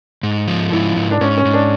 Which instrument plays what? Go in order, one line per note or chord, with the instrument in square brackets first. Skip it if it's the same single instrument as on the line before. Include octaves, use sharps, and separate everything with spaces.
[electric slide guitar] G#2
F3
[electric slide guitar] G#2 [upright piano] E4
[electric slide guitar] G#2
[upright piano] D4
[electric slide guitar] G#2 [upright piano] C#4
[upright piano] C#4
[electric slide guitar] G#2
[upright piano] D4